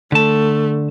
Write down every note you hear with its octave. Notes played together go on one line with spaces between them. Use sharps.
D3 A3 A5